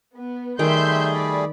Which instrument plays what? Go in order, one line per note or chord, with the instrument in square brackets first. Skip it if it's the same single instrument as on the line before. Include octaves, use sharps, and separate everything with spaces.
[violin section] B3
[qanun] D#3 G5 [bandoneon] G3 A3 G#4 [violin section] E5 C6 G6
[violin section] D5 B5